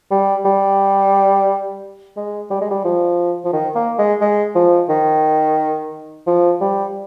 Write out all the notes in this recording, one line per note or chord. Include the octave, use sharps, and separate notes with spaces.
G3
G3
G#3
G3
G#3
G3
F3
F3
D#3
A#3
G#3
G#3
F3
D#3
F3
G3